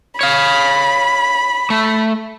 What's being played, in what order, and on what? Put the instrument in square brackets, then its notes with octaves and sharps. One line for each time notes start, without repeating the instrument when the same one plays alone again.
[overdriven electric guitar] C#5 F5 [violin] B5
[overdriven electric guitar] A3